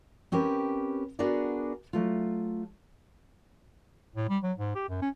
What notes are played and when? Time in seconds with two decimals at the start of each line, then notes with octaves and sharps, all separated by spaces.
0.32 C4 C#4 G4 A#4 B4
1.19 B3 D4 F#4 G#4 A#4 D5
1.93 F#3 A3 F4
4.16 A2
4.29 G3
4.43 F#3
4.58 G#2
4.75 G4
4.89 F#2
5.02 C#4